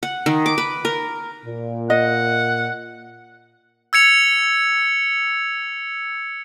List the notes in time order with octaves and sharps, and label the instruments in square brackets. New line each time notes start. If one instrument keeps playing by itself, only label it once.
[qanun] F#5
D#3
D6
B4
A#4
[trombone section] A#2
[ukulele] D#5 [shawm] F#5
[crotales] E6 G#6 C#7 F7